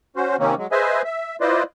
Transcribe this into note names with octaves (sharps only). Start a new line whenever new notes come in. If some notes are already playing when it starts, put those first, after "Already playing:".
C#4 F#4 C5
C3 D#3 A#3 C4 C#4
F#3 G#3
G#4 B4 C5 D#5 E5 G#5
E5
E4 F4 B4 C5 D5 D#5